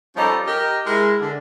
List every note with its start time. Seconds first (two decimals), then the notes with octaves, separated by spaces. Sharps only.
0.17 F3 G3 C#4 D#4 G4 A4
0.47 G4 A#4 D#5
0.86 G#3 E4 A#4
1.20 D3